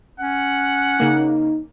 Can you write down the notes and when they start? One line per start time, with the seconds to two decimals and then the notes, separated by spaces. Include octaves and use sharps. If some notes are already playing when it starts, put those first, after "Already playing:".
0.20 C#4 F#5
1.00 C#3 A#3 D#4